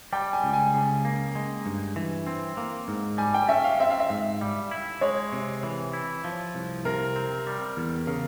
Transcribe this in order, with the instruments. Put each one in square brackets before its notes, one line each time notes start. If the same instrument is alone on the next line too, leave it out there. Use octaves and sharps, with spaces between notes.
[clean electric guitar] G3 [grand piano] G5
[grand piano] G#5
[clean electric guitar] C#2
[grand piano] G#5
[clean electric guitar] C#3
A#3
G#3
G2
E3
C4
A#3
G#2
[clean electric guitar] G3 [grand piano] G#5
[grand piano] G5
[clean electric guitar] C#4 [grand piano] E5
[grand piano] F5
[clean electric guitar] C4 [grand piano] E5
[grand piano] F5
E5
[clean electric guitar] G#2
G3
E4
[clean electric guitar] G#3 [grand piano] C#5
[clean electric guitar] C3
E3
E4
F3
C2
[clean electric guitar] C3 [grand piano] A#4
[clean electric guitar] C4
G3
E2
[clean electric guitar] C#3 [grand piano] A#4